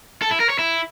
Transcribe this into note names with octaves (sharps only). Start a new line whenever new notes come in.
A4
E4
A#4
C#5
E4